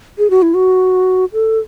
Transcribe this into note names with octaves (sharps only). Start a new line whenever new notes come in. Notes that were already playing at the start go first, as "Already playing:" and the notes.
G#4
F#4
E4
F#4
A4